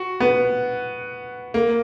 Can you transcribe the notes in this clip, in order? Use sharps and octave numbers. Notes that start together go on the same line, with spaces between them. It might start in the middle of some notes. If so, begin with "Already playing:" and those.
Already playing: F#4
B3
A#3